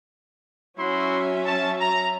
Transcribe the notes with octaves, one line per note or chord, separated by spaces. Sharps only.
F#3 C#4 E4 F#4 E5 C6
A5
A#5